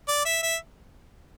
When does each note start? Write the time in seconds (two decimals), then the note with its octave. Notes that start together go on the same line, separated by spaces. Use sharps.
0.08 D5
0.25 E5
0.43 E5